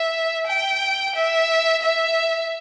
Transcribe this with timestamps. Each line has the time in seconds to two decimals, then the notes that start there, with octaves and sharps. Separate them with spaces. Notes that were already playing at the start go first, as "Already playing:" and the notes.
Already playing: E5
0.47 G5
1.15 E5
1.81 E5